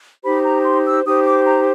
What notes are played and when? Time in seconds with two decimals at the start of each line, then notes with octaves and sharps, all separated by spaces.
0.24 D#4 G4 C5 B5
0.44 A#5
0.65 C6
0.85 E6
1.05 D#4 G4 C5 D#6
1.25 D6
1.46 A#5